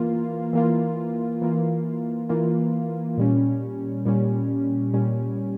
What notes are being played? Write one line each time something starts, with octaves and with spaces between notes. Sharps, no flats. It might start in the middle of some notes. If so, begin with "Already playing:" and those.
Already playing: E3 A#3 F4
E3 A#3 F4
E3 A#3 F4
E3 A#3 F4
A#2 G3 C#4
A#2 G3 C#4
A#2 G3 C#4